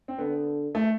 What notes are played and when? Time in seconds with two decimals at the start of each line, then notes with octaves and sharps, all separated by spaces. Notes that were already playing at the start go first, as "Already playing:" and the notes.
0.08 C4
0.19 D3 B3
0.75 A3